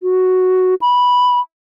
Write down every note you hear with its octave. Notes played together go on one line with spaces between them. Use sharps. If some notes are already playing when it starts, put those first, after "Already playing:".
F#4
B5